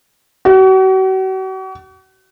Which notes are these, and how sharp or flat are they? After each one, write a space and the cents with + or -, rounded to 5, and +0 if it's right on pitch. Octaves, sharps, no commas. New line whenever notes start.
F#4 +40